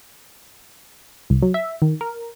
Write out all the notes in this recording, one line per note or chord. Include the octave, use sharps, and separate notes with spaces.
C2
F#3
E5
D#3
A#4